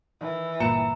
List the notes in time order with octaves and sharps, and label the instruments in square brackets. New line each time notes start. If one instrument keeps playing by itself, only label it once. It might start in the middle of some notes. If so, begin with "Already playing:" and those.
[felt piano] D#3 [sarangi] E3
[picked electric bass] G1 A#2 [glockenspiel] A#5 [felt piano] C#7